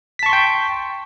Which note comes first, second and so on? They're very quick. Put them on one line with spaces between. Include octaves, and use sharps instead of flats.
B6 A5 C#6 C6 G5